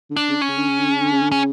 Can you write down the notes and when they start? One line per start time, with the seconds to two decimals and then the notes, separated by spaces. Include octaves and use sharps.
0.10 D3
0.16 D4
0.29 C#3
0.42 C#4
0.48 C#3
0.58 D3
0.69 C#3
0.79 D3
0.90 C#3
1.00 D3
1.12 C#3
1.21 D3
1.32 C#3 C#4